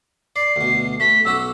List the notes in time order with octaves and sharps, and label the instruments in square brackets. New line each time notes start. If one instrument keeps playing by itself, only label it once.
[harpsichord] D5 [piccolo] C7
[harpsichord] D2 B2
[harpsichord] A3 [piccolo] B6
[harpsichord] B1 C#4 F#4 [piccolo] E6